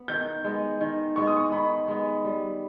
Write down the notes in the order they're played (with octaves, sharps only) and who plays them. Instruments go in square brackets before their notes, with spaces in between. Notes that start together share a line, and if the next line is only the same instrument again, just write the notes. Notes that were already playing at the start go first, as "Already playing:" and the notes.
Already playing: [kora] B3
[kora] D#3 [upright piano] G6
[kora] G#3 B3
D#3
[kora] G#3 B3 [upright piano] C#6
[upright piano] D#6
C#6
[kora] D#3 [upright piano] B5
[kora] G#3 B3
G3